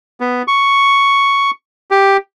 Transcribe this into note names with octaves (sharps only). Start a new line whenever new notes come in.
B3
C#6
G4